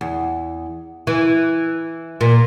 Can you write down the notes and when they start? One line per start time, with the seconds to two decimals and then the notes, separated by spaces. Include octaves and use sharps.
0.01 E2
1.07 E3
2.21 A#2